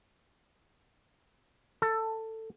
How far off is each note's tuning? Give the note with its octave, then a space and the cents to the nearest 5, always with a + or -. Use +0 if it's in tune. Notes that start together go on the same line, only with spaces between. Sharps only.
A4 +15